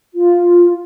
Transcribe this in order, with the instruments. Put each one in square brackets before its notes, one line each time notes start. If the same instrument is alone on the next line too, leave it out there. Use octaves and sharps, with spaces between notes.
[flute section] F4